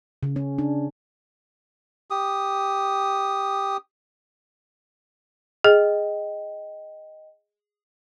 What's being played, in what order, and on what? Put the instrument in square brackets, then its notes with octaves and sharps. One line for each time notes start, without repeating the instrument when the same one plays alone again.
[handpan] C#3
C#4
D4
[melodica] G4 D#6
[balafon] G#4 [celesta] D#5 G5